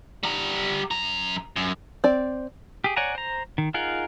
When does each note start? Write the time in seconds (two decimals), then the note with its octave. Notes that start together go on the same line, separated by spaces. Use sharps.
0.23 G3 A#5
0.91 F#2 A#5
1.56 F#2
2.04 C4 D5
2.84 G4 G#4
2.96 C#5 D5 F#5 G#5 A#5
3.15 C5 A#5
3.58 D#3
3.74 D#4 F4 G#4 A#4 F#5